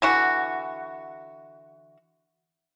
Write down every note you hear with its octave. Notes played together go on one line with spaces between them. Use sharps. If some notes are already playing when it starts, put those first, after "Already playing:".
D3 E3 F#4